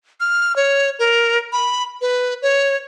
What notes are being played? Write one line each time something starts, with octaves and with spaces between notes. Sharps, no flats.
F6
C#5
A#4
B5
B4
C#5